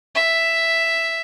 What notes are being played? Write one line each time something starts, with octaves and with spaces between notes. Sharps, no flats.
E5